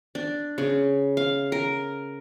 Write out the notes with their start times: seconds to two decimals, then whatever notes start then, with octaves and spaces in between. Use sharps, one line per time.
0.15 D4
0.58 C#3
1.17 F5
1.52 A#4